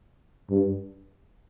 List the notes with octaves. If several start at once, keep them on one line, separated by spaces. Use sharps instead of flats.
G2